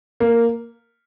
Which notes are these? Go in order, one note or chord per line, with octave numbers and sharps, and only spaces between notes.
A#3